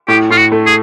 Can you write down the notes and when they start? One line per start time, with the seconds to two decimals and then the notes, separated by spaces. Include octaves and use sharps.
0.08 A2 G4
0.30 A2 F4
0.37 F#4
0.52 A3
0.66 G#4